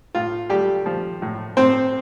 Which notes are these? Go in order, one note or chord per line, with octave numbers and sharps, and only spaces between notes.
A2 F4
G3 A3 G4
F3
A2
A2 C4 C5